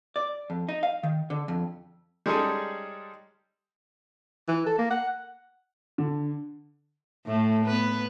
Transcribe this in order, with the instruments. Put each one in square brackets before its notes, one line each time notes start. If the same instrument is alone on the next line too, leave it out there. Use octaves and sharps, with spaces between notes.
[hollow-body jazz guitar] D5
F2
D#4
F5
D#3
D3
F2
[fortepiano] G3 G#3 C#4 D#4 G#4 A4
[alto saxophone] E3
A4
A#3
F#5
[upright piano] D3
[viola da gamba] A2 A3
B3 B4